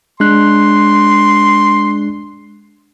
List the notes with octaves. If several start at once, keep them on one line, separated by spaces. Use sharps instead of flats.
G#3 D4 C6 F#6